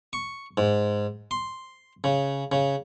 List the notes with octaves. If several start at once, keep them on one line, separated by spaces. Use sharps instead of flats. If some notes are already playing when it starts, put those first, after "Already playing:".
C#6
G#2
C6
C#3
C#3